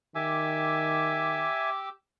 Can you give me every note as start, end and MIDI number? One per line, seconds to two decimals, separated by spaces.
0.15 1.47 51
0.15 1.89 67
0.15 1.70 76
0.15 1.70 80
0.15 1.89 86
0.15 1.89 88